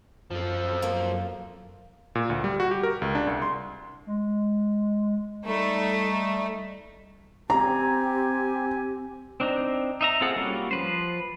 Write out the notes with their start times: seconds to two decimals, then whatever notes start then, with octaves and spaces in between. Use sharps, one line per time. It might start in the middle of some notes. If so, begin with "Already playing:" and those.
0.31 F#2 F3 A4
0.82 A#3
2.15 A#2
2.30 D2
2.44 G3
2.60 F#4
2.71 G4
2.83 A#4
3.02 C#2
3.15 D4
3.27 C2
3.42 C6
4.07 G#3
5.46 G3 A3 D#4
7.50 C4 G4 G#5 A#5
9.40 C4 D4 D#4
10.01 D#4 E5 A#5
10.21 C4 F4 G#4 A4 F#5
10.36 G3 A#3 C#4 F4 F#4
10.71 F3 B4 C5